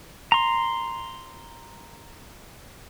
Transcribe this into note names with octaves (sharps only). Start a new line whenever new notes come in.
A#5 C6